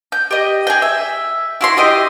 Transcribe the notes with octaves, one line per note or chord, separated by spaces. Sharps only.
G6
G4 D#5
G#4 G5
E5
E4 F#4 C6
E4 G4 D#5